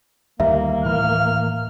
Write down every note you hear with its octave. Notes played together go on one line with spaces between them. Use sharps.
D2 D#3 G3 A#3 E5
A2 E3 F6